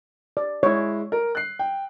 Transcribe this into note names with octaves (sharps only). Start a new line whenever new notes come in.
D5
G#3 E4 C#5
A#4
F#6 C7
G5